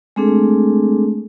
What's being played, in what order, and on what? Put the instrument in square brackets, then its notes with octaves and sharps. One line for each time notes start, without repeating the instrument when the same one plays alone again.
[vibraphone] G#3 A3 C4 D4 G#4 A4